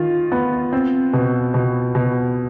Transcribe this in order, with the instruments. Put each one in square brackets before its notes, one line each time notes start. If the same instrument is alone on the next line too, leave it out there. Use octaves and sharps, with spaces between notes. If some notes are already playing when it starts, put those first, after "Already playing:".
Already playing: [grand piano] D#3 F4
B3
C4
B2
B2
B2